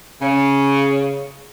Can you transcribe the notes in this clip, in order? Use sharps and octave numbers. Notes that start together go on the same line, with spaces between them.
C#3